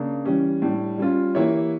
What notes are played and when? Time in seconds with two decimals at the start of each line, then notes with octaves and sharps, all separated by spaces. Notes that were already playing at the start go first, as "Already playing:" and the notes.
Already playing: C#3 A#3 D4
0.25 E3 G3 C#4 G4
0.62 A2 G3 D4
0.98 G3 C#4 F4
1.35 E3 A#3 E4 G4 C#5